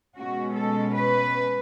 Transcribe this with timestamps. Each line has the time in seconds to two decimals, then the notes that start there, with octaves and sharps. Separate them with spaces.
0.17 B2 G#3 C#4 F#4
0.56 A4
0.94 B4